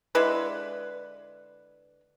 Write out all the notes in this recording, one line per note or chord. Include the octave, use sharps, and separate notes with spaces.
D3 G#3 E4 B4